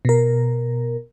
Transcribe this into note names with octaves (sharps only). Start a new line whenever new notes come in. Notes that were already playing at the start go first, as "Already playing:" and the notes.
B2 A#4